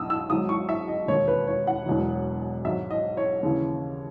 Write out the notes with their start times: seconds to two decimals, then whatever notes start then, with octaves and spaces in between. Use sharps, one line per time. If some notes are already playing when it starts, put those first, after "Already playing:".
Already playing: E2 B2 F#3 D#6 E6
0.10 E6
0.29 G#1 G#2 F#3 D#6
0.49 C#6
0.69 E5
0.88 D#5
1.08 E1 D#2 D#3 C#5
1.28 B4
1.47 C#5
1.67 F#5
1.86 E1 E2 B2 F#3
2.65 G#1 G#2 F#3 E5
2.90 D#5
3.17 C#5
3.43 D#2 C#3 E3